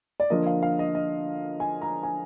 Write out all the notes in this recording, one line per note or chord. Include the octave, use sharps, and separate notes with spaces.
D5
D3 F3 A#3 D#5
F5
F5
D#5
D#5
G#5
A#5
G#5